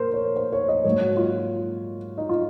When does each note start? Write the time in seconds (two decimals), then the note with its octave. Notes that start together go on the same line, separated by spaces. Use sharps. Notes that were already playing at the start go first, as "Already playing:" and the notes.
Already playing: A#2 A#4 C5
0.14 C#5
0.36 C5
0.52 C#5
0.68 D#5
0.84 G#2 F#3 A#3 C#5
1.01 F#4
1.17 F4
2.18 D#4
2.29 F4